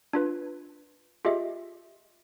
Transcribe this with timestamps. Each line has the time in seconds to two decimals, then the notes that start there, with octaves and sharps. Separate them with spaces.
0.13 D4 F4 B4
1.25 F4 G4 G#4 D#5 E5